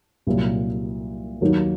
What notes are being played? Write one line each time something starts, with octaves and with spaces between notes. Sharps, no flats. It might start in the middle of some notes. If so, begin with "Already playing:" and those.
C2 A#2 F#3
D#2 D#3 F#3 A#3 D#4